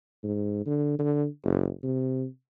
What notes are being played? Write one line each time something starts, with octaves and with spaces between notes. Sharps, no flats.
G#2
D3
D3
F#1
C3